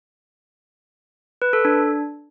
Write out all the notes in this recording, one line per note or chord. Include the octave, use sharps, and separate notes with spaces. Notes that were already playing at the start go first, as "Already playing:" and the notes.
B4
A4
D4